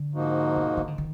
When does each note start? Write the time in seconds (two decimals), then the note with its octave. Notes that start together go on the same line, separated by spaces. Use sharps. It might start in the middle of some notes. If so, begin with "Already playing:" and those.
Already playing: D3
0.13 G#2 F3 A#3 D#4 F#4
0.56 B2
0.77 D#3
0.88 D3
0.98 D#3